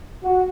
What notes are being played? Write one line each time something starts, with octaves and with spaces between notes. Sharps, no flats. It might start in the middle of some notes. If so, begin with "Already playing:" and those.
F#4